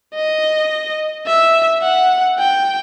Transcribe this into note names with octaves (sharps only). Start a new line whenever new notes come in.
D#5
E5
F#5
G5